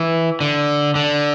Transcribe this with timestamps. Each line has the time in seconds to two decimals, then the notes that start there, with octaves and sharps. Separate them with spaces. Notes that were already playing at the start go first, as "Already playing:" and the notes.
Already playing: E3
0.41 D3
0.95 D3